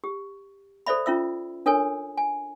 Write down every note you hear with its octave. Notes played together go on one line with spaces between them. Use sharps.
G4
A4 C5 D5 E5 B5
C#4 F4 E5 E6
D4 A4 A#4 C#5 G#5
G#5